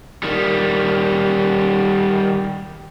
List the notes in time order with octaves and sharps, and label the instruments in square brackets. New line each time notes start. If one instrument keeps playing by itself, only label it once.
[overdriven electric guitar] D#3 G3